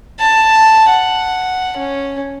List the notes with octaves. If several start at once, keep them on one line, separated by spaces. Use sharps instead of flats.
A5
F#5
C#4